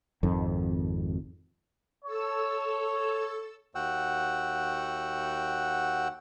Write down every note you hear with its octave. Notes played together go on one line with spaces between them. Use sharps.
G#1 F2 D#3
A4 C#5 E6
D#2 F#4 F#5 G5 E6